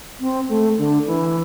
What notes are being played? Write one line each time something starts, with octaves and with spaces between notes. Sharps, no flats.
C4
A3
D3
E3